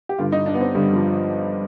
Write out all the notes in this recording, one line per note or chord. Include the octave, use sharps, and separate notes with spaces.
G4
G2 D3 F4
D#4
D4
B3
C4
G2 D3 G3
F3